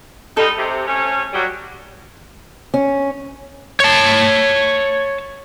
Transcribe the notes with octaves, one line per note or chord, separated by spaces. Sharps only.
G3 G#3 D#4 A4
C3
A3 C4 C#4
F#3 G3
C#4
C#5 A5